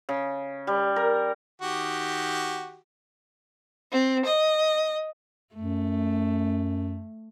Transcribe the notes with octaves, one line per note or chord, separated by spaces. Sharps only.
C#3
G3
A#4
D#3 F#4 G4
C4
D#5
F#2 A3